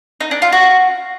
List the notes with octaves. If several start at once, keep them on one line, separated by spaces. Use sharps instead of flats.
D#4
D4
F4
F#4